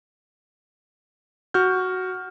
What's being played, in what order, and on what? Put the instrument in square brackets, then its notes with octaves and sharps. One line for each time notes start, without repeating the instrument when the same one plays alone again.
[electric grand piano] F#4 F6 G6